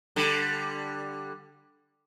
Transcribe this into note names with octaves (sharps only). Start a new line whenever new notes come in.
D3 G3